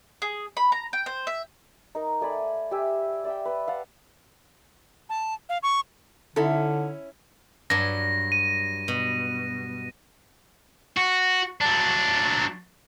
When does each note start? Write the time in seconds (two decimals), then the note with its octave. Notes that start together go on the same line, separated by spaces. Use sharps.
0.22 G#4
0.57 B5
0.72 A#5
0.93 G5
1.06 C5
1.27 E5
1.95 D#4 A#4
2.21 A3 D5 G#5 B5
2.71 G4 E5 G#5
3.24 D5 E5 G5
3.45 B4 G5
3.68 F5 F#5 A5
5.10 A5
5.49 F5
5.63 C#6
6.36 D3 C#4 D#4 E4 A4
7.70 G2 F#3 A#6
8.32 D#7
8.88 B2
10.97 F#4
11.61 F#3 D4